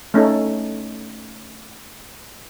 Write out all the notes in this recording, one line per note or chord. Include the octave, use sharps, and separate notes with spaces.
A3 C#4 D#4 A4